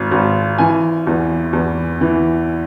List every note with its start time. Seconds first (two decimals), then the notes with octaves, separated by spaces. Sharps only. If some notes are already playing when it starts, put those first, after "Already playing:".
Already playing: G#1
0.11 G#1
0.58 E3 G#5
1.07 E2
1.53 E2
2.01 E3